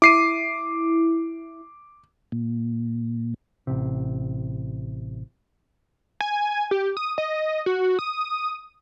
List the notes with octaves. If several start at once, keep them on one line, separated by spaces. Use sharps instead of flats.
E4 D6 C7 D#7
A#2
A1 C3
G#5
G4
D#6
D#5
F#4
D#6